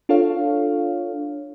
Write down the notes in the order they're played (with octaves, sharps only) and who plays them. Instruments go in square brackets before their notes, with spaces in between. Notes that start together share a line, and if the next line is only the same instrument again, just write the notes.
[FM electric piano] D4 F4 A4 C#5 F5